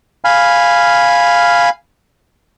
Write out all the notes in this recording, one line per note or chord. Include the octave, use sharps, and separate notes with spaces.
F5 G#5 B5 F6